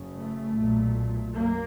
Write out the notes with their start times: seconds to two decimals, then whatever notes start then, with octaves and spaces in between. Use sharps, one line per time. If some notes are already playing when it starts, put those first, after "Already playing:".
Already playing: F#1 F#2 C#3
0.13 A3
0.54 B1 A#2
1.36 F#2 A#3